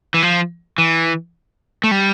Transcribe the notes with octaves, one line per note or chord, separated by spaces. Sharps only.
E3
F3
E3
A3
G3